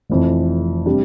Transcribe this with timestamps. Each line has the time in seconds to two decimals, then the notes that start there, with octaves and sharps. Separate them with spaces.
0.09 F1 F2 E3
0.86 C3 G3 D4